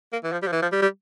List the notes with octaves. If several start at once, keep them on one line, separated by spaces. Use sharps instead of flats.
A#3
E3
F3
G3
F3
E3
F3
G3
G3